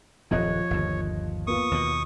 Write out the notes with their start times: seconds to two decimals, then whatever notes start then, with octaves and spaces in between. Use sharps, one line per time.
0.31 D#1 F#2 D#3 F3 C#5 D#5 F#6
0.71 G1 D#2
1.47 A#3 B3 F4 C#6 D#6
1.71 D#2 B2